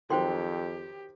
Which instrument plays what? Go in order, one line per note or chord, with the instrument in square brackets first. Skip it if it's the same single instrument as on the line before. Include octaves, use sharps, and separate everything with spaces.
[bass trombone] F2 [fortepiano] D#3 F#3 [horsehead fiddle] G4 [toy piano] C5 G5 C6